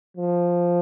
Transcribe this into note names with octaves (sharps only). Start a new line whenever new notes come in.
F3